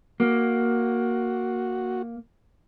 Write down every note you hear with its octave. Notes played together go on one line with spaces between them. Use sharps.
A#3 F#4